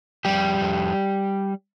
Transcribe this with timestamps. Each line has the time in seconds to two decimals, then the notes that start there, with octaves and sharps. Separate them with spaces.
0.25 F2 G3 G4
0.61 F2